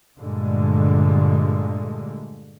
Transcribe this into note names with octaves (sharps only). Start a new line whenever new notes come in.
G2 A#2 D3 G#3 A3